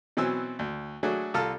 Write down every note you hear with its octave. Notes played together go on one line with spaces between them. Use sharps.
B2 E3 F#3 C4 G#5 E6
D2
F#3 A3 D4 F#4 G#4
C2 F4 A4 A5 A#5 F6